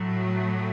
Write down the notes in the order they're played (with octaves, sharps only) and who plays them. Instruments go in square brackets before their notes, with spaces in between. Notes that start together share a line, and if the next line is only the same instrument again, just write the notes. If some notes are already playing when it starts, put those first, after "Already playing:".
Already playing: [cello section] A2 F#3 A3